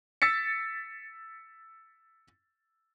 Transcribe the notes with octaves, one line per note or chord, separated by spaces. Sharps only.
E6 A6 B6 C#7